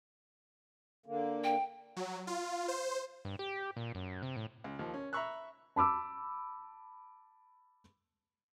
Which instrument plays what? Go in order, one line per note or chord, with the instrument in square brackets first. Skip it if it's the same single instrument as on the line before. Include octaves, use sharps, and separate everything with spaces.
[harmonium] D3 A#3
[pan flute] G5
[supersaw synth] F#3
F4
C5
[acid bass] G2
G4
A#2
F#2
C3
A2
[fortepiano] C#2
D#2 F3
C#4
E5 A#5 B5 C#6 E6 F#6
[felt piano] A5 B5 D6 E6